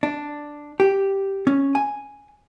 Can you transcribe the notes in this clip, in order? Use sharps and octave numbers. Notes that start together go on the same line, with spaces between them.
D4
G4
C#4
G#5